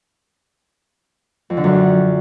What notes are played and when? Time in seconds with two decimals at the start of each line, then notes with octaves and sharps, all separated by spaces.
1.50 F2
1.57 D3
1.64 F#2